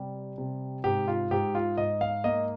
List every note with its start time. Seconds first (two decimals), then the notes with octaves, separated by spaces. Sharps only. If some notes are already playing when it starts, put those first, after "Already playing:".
Already playing: C3 G3
0.38 C3
0.84 G#2 G4
1.08 F4
1.31 G#2 G4
1.55 F4
1.77 G#2 D#5
2.01 F5
2.24 A#3 D#5